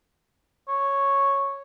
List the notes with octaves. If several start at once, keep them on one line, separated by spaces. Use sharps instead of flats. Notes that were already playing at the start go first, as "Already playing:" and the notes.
C#5